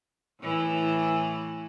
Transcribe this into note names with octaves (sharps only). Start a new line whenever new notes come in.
A2 E3 E4